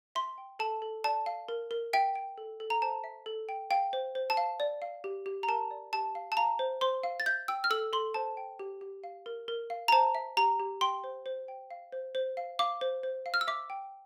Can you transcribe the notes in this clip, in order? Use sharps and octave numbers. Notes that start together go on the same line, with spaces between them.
E5 C6
G5
A4 A5
A4
D5 A5
F5
A#4
A#4
E5 G5
G5
A4
A4
A#5
C5 A5
E5
A4
G5
F5 G5
C5
C5
A5
F5
D5
F5
G4
G4
A#5
A#4 A5
D5
G4 A5
F5
A5
F5 A#5
C5
C5 C6
F5
A6
E5 G6
G5 E6
F6
A4 E6
A4 C6
C5 A5
G5
G4
G4
F5
A#4
A#4
F5
A#5
C5 A5
E5
G4 A#5
G4
G5 C6
C5
C5
G5
F5
C5
C5
F5
F5 D6
C5
C5
F5
F6
E6
E5 D6
G5